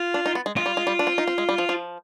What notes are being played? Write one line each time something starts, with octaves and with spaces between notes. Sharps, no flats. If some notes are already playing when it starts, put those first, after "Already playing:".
Already playing: F4
D4
D#4
B3
G#3
G#3 F4
G3
G#3
G3
D4
C4
D#4
C4
G#3
G3
F3
F3